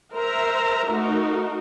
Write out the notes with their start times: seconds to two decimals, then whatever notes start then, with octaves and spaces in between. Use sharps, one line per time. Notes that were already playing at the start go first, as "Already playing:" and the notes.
0.15 A#4 C5 E5 A#5
0.90 A3 D#4 F#4 A#4